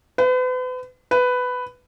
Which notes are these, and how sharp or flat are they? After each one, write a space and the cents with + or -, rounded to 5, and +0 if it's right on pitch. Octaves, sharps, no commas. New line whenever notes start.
B4 +40
B4 +10